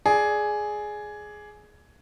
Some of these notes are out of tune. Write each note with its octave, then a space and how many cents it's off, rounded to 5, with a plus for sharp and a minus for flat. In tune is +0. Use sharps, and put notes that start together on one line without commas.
G#4 +10 D5 +0